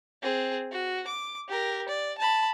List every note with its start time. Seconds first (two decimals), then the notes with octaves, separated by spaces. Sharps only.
0.22 C4 G#4
0.72 F#4
1.07 D6
1.49 G4 A#4
1.89 D5
2.18 A5 B5